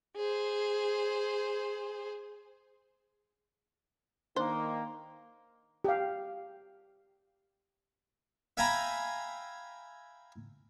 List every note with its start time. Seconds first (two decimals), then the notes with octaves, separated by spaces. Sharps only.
0.16 G#4 C5
4.36 D#3 A#3 D4 C5
5.84 G4 F5
8.57 E5 F5 G5 G#5 A#5 B5